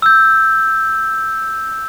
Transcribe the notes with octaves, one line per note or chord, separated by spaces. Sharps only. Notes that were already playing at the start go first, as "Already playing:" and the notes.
E6 G6